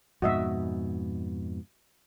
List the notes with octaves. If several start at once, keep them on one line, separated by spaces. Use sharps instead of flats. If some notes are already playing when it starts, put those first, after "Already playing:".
F2 G#2 B2 F#4 D#5 E5